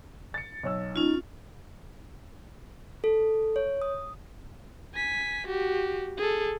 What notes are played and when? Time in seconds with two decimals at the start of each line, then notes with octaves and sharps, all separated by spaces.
0.34 A6 C#7
0.63 B1 C#5 E6
0.96 C#4 D#4 F4
3.04 A4
3.56 C#5
3.82 D#6
4.95 G#5 B6
5.47 F#4 G4
6.17 G#4 A4